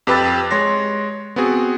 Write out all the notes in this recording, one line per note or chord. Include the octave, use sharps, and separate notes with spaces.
F2 G4 B4 B5 E6 A6
G#3 C#5 C6 A#6
B3 C4 F#4 G#4